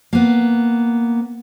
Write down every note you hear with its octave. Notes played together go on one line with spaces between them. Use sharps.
A#3 B3